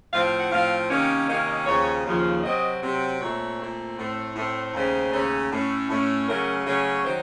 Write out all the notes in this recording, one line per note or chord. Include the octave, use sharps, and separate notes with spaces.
A2 F3 C4 F5
F5
F#5
A2 F3 C4 F5
C3 D#3 A#3 C#4
C3 D#3 A#3 C#4 F5
D#5
D#2 C#3 F3 C#5
D#2 C#3 F3
C3 F#3 C4 D#5
C3 F#3 C4
A#2 A3 C4 C#5
A#2 A3 C4
A2 A3 C4
A2 A3 C4
D#2 C#3 A3 C#4 C5
D#2 C#3 A3 C#4
A2 A3 C#4
A2 A3 C#4
C#3 F#3 A3 C#4 A#4
C#3 F#3 A3 C#4
C#5
D#3 F#3 C5